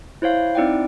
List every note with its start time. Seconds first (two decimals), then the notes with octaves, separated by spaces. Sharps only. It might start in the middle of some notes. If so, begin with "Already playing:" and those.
0.22 E4 C5 C#5 F5
0.55 C4 D#4 E4 D5 F#5 G5